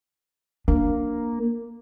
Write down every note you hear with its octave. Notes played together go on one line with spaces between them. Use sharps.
A#3 D4